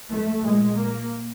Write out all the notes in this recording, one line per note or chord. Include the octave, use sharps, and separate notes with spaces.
A3
A#2 G#3
A#3